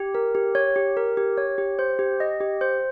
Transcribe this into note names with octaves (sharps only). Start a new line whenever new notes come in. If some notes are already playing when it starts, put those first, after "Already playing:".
Already playing: G4
A#4
G4
C#5
G4
A#4
G4
C#5
G4
C5
G4
D#5
G4
C5